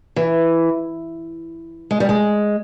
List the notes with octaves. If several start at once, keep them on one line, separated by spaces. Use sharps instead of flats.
E3
G#3
G3
G#3